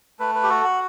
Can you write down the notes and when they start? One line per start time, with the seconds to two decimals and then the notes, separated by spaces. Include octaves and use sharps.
0.19 A3 B4
0.35 B4
0.43 G4
0.49 F#4 A4
0.64 F#5